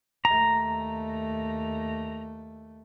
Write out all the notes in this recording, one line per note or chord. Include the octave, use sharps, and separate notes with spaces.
D#2 A3 A#5